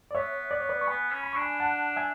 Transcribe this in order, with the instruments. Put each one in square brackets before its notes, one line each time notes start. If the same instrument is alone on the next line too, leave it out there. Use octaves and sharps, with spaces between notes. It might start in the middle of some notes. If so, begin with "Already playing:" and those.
[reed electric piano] D5
[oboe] B3 [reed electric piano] C#5 E5
[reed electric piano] D5
C#5
B4 D5
C#6
[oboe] B3 [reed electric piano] G#5 B5
[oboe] C#4
[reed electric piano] B5
[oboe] D4 [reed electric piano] C#6
[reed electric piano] G#5 B5
F#5 A5
E5 G#5